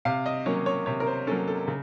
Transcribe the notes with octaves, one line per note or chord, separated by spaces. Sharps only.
C3 F5
D#5
F#3 A#3 C#4 C#5
C#5
C3 C#5
A#4
C5
F#3 A#3 C#4 A4
A4
C#3